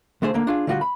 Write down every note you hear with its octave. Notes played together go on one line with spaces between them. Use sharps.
B1 D3 A3 G#4 C5
D3 A#3
D4 F4 G#4
D3 G3 F4 F#4 F#5
B5